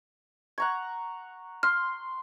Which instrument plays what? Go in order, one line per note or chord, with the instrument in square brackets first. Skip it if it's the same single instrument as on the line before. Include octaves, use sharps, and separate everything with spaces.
[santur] F#5 A#5 C#6 [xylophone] G#6
[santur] C6 [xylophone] F6